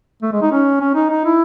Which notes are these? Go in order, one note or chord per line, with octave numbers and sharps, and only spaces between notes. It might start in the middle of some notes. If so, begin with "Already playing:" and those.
A3
G#3
D#4
C#4
C#4
D#4
D#4
E4